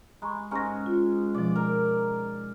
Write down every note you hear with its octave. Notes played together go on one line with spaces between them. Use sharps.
G#3 A#5 B5 C#6
G#2 G#3 C#4 A#5 C#6 A#6
F4
B2 F3 D5
A#4